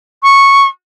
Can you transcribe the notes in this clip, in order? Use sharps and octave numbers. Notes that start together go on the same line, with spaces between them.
C#6